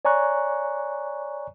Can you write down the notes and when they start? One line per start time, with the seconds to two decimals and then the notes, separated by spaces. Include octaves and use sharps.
0.05 C#5 D5 G#5 A#5 C#6 F#6